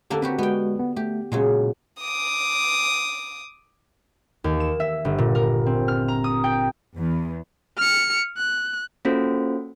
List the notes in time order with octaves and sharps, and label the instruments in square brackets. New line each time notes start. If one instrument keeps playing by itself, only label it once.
[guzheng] D3 A#3 D4 [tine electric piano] G4 A4
[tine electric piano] C4 [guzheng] F#4 G4 B4
[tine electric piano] G#3 F#4 [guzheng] B3 G5
[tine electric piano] B3
[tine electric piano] A3 [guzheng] G4
[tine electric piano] A#2 [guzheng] C#3 F#3 G#3
[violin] D6 D#6
[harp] D#2
E7
E5
G1
A#2
A#4
C4
F6
A#5
D#6
G5
[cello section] E2
[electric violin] F6 C#7
F#6
[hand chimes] A#3 C#4 F4 F#4 A4 C5